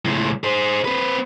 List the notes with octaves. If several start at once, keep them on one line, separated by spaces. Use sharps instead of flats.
C#2 A2
G#4 C5
C4 B4